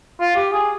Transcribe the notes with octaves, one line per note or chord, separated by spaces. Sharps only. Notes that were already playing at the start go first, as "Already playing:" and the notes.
F4
G4
G#4